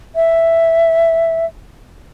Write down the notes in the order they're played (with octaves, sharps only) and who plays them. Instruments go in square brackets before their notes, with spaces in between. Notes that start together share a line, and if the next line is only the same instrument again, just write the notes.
[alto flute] E5